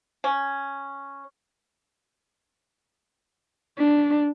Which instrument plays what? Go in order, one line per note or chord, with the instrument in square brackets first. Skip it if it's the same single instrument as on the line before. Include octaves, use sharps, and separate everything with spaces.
[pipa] C#4
[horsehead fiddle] D4